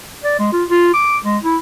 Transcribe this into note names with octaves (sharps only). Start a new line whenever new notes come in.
D5
G#3
F4
F4
D6
G#3
E4